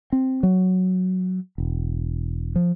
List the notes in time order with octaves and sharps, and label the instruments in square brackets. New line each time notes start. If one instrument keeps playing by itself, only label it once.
[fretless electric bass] C4
F#3
E1
F3